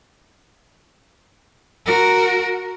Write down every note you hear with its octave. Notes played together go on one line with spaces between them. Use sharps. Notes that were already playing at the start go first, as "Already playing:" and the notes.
F#4 A#4